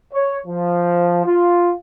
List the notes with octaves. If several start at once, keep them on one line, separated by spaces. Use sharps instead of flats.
C#5
F3
F4